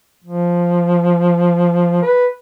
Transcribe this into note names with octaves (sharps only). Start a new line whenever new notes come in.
F3
B4